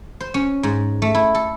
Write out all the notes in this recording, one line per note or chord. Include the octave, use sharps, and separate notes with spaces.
C5
C#4
G#2
A3
E4
A4